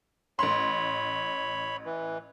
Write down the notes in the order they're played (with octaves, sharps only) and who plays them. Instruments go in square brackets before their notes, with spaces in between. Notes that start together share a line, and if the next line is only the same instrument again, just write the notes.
[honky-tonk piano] A1 C6 [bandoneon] C#5 B5
[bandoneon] E3